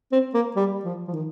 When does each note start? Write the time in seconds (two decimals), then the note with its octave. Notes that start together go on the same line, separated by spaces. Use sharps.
0.12 C4
0.34 A#3
0.56 G3
0.85 F3
1.08 F3
1.13 D#3